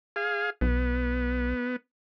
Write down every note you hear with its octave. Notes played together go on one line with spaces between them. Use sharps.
G#4 F5
B1 B3